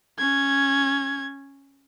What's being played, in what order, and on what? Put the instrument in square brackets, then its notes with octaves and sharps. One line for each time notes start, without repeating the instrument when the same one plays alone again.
[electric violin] C#4 G#6